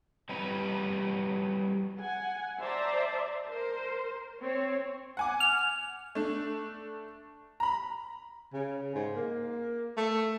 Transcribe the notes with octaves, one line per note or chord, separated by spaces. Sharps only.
G3 C4 E4 F#4 B4
F#5 G#5
C5 D5 E5 A5 A#5
A#4 C5
C4 C#5
F#5 G#5 D6
F6
A3 D4
A#5 B5
C#3
G#2
A#3
A3